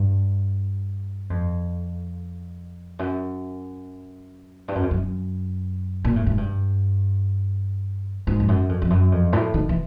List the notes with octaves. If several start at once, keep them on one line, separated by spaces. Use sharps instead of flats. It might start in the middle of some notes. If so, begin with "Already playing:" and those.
Already playing: G2
F2
F#2
G2
F#2
F2
F#2
A#2
A2
G#2
G2
G#2
F2
F#2
F2
F2
F#2
F2
A2
D#3
E3